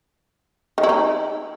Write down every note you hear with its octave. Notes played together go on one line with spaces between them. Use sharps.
D#3
E4
D#4